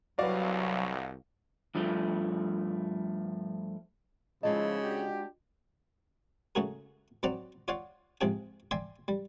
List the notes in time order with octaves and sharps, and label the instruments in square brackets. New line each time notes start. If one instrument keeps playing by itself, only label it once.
[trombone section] C2 [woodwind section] F#3 [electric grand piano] F#4 F5 [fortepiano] B4 D5
[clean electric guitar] G2 F3 A3
[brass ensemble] G#2 F3 E4 [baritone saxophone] C#3 [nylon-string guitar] G#3 F4 A5 [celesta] D#5
[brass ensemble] D4 F#4 G4
[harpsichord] C#3 A3 F#4 G#4 A#4
F#3 C4 C5 D5 F#5 A#5
F4 C#5 D5 F5 F#5
G#2 C3 F3 G#4 G5
D5 E5 G5 G#5 C6
G3